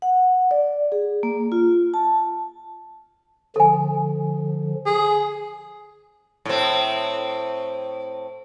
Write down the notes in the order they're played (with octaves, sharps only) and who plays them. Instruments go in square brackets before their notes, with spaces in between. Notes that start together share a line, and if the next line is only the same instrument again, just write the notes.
[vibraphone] F#5
D5
G#4
A#3
F4
A5
[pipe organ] D3 F3 [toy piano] A4 G#5
[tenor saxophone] G#4
[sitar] A2 C4